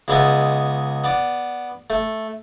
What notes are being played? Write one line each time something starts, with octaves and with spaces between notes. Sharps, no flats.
C#2 G#3 B3 E5 A5
B3 D5
A3